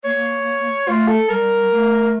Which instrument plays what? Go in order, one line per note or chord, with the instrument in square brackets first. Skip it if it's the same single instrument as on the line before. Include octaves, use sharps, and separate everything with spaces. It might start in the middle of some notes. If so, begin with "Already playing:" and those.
[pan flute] A#3 [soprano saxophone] C#5
[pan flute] A3 [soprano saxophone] F4
[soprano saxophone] A4
[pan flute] G3 [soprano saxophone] A#4
[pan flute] A3